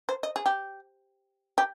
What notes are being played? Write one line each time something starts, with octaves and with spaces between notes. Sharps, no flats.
C5
D#5
G#4
G4
G4